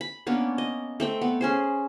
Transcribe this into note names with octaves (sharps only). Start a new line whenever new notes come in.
B5
A#3 B3 C#4 D4
D#5
A3 C4 G5
B3
C#4 G#4 C5